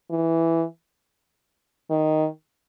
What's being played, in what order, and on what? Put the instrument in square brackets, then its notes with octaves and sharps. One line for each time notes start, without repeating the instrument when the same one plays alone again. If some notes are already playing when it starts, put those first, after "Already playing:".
[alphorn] E3
D#3